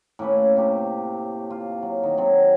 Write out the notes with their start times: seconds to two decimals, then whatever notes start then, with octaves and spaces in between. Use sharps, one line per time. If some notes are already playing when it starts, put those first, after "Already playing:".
0.19 A2 A#3 C#4 B4
0.57 C3 G4 C5
1.50 F4
1.82 F#3
2.03 D#3
2.18 F#3 C4 A4